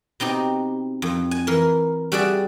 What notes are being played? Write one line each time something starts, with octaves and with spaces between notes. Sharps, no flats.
B2 C4 D#4 G4
F2
G#5
E3 A#4
G3 F#4 G#4 D5 E5